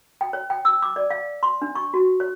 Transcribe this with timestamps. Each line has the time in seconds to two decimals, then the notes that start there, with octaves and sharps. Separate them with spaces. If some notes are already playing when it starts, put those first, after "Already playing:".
0.21 G5
0.33 C#5
0.50 G5
0.65 E6
0.82 D6
0.96 D5
1.10 F5
1.43 C6
1.62 D4
1.75 C#6
1.94 F#4
2.20 C#5